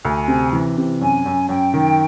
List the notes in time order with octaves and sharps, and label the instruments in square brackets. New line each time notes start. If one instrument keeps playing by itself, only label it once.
[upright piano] D2 [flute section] G#5
[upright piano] C3
E3
C3
[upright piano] F#2 [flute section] G#5
[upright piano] F#2
[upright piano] F#2 [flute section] G5
[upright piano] D#3